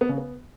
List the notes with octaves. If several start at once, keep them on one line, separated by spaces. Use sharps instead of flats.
B3
C#3
B3